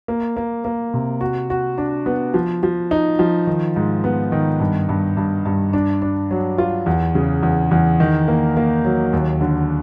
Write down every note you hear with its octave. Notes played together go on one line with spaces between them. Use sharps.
A#3
A#3
A#3
C3
F#4
F#4
D4
B3
F3
F3
D#4
F3
D#3
G#2
B3
D#3
G2
G2
G2
G2
D4
D4
F#3
F4
E2
C#3
E2
E2
D#3
A#3
A#3
F#3
D#2
D3